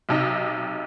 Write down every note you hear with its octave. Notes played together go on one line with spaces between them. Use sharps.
B1 C3 D#4